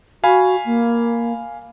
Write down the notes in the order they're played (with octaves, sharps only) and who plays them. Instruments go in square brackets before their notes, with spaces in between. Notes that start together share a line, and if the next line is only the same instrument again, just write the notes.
[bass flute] F#4 [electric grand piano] F5 G#5 B5
[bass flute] A#3